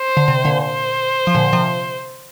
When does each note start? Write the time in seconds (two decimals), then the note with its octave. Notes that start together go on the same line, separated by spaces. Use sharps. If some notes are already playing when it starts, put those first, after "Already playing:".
Already playing: C5
0.17 D3
0.28 C3
0.45 A#2 D3
0.63 C5
1.27 F3
1.35 A#2 D3
1.53 C3 F3